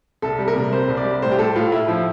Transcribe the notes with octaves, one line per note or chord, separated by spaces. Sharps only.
C2 A4
G3
A#4
C3
G3 C5
C2
D5
G3
A2 C5
G4
A2 A4
A2 F4
A2 E4
F3 E4